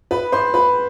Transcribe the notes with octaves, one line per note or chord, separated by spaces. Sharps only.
B4 B5
C5 C6
B4 B5